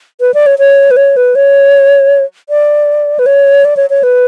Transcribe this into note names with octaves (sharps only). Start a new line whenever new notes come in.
B4
D5
C#5
C#5
B4
C#5
B4
C#5
D5
B4
C#5
D5
C#5
C#5
B4